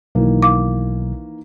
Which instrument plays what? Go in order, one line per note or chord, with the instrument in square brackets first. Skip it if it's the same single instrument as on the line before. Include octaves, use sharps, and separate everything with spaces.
[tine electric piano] B1 [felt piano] D#3 E3 A#3
[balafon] F5 D6